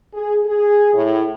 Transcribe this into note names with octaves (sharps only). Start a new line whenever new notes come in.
G#4
G#4
A2